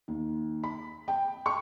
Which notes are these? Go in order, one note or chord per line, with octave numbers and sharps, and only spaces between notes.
D#2
B5
G5
C#6